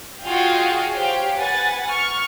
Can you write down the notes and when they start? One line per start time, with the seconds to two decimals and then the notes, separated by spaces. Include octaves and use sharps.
0.22 F4 F#4 G#4 D#5 F5 G5
0.92 G4 C5 C#5 F5 G5
1.35 B4 F#5 G#5 A6
1.86 C#6 F6